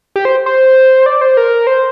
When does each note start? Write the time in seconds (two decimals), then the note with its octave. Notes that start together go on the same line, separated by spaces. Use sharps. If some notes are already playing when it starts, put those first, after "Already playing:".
0.16 G4
0.25 C5
0.46 C5
1.06 D5
1.21 C5
1.37 A#4
1.67 C5